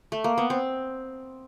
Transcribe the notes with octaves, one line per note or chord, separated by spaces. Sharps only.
A3
A#3
B3
C4